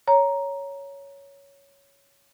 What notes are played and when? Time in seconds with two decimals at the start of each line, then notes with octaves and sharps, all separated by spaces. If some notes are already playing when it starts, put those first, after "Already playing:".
0.07 C#5 A#5